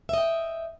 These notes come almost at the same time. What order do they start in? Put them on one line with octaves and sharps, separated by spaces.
E5 D#5 G5